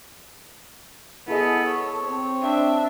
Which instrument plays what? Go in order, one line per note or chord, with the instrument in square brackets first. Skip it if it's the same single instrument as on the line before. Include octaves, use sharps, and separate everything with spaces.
[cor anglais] B3 [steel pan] E4 G#4 D#5 [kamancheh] A4
[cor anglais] C#5
[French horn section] C4
[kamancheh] D4 E5